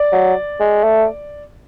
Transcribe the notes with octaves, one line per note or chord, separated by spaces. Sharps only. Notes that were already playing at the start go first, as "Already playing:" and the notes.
Already playing: D5
F#3
G#3
A3